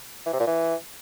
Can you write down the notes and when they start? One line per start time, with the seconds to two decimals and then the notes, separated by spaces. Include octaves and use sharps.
0.26 E3
0.33 C3
0.40 A#2
0.47 E3